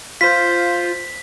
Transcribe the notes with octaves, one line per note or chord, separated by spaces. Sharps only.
F4 C5 B6